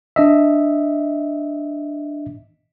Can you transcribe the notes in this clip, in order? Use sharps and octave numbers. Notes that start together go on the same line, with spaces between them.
D4 D#5 E5